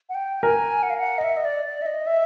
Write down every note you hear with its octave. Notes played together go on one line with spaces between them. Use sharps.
F#5
G5
A#4 G#5
F#5
F5
F#5
D#5
E5
D#5
D5
D5
E5
D#5
E5